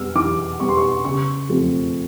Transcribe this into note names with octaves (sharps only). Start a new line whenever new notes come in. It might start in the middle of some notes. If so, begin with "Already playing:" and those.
Already playing: G3 B3 E6 F6
E3 D6
G3 B3 C#6
C6
C#6
C#3 C#6
F3 A3 C4